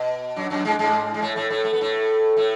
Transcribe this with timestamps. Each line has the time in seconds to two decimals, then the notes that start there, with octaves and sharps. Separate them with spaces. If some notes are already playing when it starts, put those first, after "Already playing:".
Already playing: B2
0.36 F#2 F#3
0.50 F#2 F#3
0.65 G#2 G#3
0.79 G#2 G#3
1.14 G#3
1.22 A2 A3
1.36 A2 A3
1.50 A2 A3
1.65 A3
1.73 B3
1.81 A2 A3
2.37 A2 A3